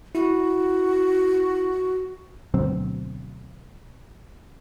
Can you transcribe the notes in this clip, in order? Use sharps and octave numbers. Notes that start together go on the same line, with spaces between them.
E4 F#4
D2 B2 F#3 C4